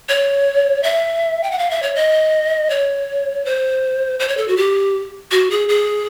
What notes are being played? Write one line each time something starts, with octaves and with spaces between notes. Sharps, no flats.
C#5
E5
G5
F#5
F5
E5
C#5
D#5
C#5
C5
C5
C#5
A4
F#4
G4
F#4
G#4
G#4